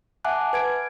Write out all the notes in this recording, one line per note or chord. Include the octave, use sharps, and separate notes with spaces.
E5 F#5 G#5 A5 D6 F#6
B4 G#6 D7